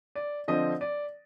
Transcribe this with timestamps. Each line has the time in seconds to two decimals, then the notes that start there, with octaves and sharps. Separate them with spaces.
0.15 D5
0.48 D3 F3 C4 D#5
0.81 D5